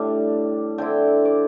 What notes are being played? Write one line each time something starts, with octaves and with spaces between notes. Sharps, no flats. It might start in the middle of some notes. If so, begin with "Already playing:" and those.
Already playing: A2 G3 D4
D3 C4 E4 G5
D5